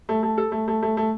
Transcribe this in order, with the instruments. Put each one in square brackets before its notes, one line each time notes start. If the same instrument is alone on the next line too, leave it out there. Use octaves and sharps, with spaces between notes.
[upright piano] A3
A3
A4
A3
A3
A3
A3